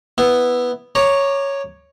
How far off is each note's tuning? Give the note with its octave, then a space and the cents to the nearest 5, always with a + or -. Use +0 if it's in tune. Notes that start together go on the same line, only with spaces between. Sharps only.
B3 +0 E4 +0
C#5 +0 A#5 +0 D6 +25